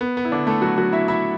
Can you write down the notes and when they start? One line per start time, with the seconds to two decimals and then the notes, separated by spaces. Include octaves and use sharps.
0.01 B3
0.17 B3
0.25 E4
0.32 D3 D4
0.47 A3 A4
0.62 F#3 F#4
0.77 F#3 F#4
0.92 E4 E5
1.08 E4 E5